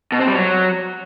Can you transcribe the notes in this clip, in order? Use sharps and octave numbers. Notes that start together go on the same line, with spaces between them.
B2
C4
G3
F#3